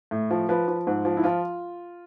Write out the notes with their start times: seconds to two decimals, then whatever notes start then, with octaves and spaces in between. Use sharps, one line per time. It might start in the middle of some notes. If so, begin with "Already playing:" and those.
0.11 A2
0.31 F3
0.49 F3 B4
0.68 F3
0.87 G#2
1.05 F3
1.17 E4
1.24 F3 F4